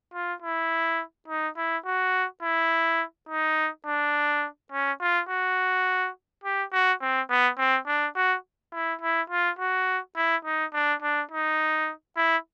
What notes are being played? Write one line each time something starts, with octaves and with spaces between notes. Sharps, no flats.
F4
E4
D#4
E4
F#4
E4
D#4
D4
C#4
F4
F#4
G4
F#4
C4
B3
C4
D4
F#4
E4
E4
F4
F#4
E4
D#4
D4
D4
D#4
E4